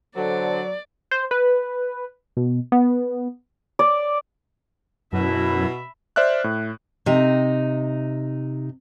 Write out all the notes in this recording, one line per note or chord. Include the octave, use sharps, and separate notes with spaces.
D3 F#3 A4 C5 D5
C5
B4
B2
B3
D5
F#2 B2 E4 E5 B5
C5 D5 E5 F6 F#6
A2
C3 D#4